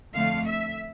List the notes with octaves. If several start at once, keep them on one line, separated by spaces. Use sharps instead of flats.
F2 D3 A3 F5
E5